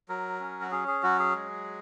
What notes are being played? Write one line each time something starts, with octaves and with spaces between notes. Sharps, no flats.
F#3 A#4
C#4
F#4
C#4 G#4
G#4
F#3 F#4
G#4
G#3